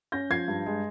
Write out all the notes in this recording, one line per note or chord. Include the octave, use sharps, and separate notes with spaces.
C#4 G6 A#6
F3 G#6 C7
G2
G#3